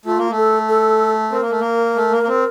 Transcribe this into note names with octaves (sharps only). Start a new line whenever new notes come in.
A3 F4
A#3
A3
A4
A4
C4 A#4
A#3
A3
A#3
A3
A#3
A#3
C4